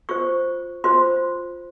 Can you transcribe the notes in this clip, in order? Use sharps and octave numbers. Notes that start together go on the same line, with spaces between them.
F4 C5 C#6
F4 C5 C6